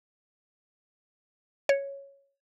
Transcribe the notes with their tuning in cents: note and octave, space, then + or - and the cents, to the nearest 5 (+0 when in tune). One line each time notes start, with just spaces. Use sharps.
C#5 +0